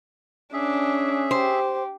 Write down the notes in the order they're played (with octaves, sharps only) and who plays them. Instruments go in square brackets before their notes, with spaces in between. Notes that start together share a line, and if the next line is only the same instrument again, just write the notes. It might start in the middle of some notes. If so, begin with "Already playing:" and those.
[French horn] C#4 [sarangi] D4 [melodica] G#4 E5
[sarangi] G4 [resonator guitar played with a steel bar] C5